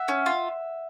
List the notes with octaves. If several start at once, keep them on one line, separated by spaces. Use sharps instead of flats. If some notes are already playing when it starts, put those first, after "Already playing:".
Already playing: E5 F#5
C#4
F4